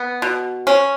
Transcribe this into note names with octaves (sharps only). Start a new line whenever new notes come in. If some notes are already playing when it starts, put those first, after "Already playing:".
Already playing: B3
B2
C#4